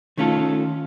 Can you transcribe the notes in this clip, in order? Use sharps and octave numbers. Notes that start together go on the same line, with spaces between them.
D#3 A3 C#4 F4 A4